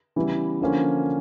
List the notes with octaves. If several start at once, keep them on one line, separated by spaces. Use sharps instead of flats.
C#3 E3 G3 B3 E4
D3 F3 A#3 C#4